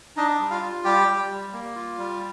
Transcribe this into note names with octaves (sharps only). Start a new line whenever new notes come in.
D4 D#4 D#5
G3
F4 F5
F4
G3 G4 G5
G3
G3
A#3
F4
G3